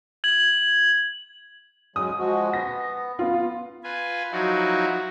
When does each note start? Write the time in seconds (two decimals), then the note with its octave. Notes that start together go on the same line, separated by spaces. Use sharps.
0.24 G#6 F#7
1.96 F#3 G#3 D#6
2.19 F3 G#3 F#4
2.53 B3 A#6
3.19 B3 F4
3.84 F4 B4 G#5
4.32 F3 F#3 D#4 E4 F#4